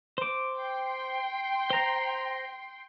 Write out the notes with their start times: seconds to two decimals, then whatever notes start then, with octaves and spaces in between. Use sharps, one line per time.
0.18 C5 D6
0.58 G5 C6
1.70 C5 A#5